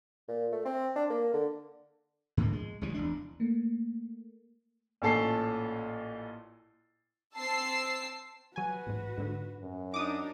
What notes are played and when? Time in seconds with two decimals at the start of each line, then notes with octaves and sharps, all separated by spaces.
0.28 A#2
0.52 A3
0.65 C4
0.96 D4
1.10 A#3
1.33 D3
2.37 G#2 D3 F3 A#3
2.53 G#3
2.81 C#2 C#3 E3 G3
2.94 F1 E2 D4
3.40 A3 A#3
5.02 A1 A#2 C#4 A4 A5 C7
7.36 C4 A5 E6 C7
8.56 F#3 F#4 B4 G#5
8.87 A1 G#2
9.18 G#2 D3
9.60 F#2
9.94 D4 D#4 D6 D#6